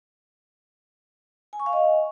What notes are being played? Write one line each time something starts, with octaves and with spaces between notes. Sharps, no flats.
G#5
C#6
F5
D#5